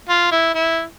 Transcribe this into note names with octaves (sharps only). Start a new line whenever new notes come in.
F4
E4
E4